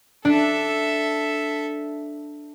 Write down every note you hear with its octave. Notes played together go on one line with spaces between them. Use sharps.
D4 A4 E5